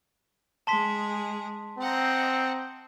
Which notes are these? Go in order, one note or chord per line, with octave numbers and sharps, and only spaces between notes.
G#3 G#4 A5 C6 B6
C4 D#5 F#5 A#5